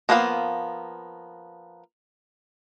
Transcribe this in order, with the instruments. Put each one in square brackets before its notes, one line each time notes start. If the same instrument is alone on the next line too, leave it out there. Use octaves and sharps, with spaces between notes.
[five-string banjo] F3 A#3 B3 F4 F5